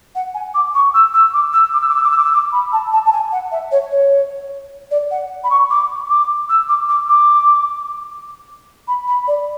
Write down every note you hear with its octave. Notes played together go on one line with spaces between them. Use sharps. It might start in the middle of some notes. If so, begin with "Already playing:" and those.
F#5
G#5
D6
C#6
E6
E6
D6
E6
D6
E6
D6
E6
D6
E6
D6
E6
D6
B5
A5
A5
A5
G#5
F#5
E5
C#5
C#5
D5
F#5
B5
C#6
D6
D6
E6
D6
D6
D6
B5
B5
D5